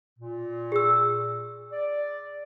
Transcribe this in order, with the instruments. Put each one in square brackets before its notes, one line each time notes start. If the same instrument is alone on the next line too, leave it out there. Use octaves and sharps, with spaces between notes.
[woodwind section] A#2
[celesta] G#4 E6
[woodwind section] D5